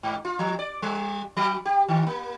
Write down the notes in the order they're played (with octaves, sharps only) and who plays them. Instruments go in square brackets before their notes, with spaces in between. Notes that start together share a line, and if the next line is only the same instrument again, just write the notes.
[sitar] G#2
F4
F3
D5
G3
F#3
G4
D#3
A#3